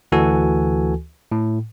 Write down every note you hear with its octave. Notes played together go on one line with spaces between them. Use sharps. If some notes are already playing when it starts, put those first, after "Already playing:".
D2 E3 F#4 A4 G#5
A2